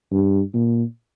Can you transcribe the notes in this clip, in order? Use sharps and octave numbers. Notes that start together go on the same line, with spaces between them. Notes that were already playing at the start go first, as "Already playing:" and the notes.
G2
A#2